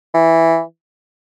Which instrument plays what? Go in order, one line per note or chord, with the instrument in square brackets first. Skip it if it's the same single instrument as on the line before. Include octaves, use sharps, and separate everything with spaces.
[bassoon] E3